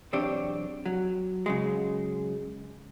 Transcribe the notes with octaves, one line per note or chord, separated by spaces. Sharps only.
B1 E2 C4 D4 G4 C#5
F#3
C#3 F#3 G#3